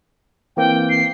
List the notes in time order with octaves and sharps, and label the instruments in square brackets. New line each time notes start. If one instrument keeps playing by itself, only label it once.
[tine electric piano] E3 A#3 C4 [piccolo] G5
[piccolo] C7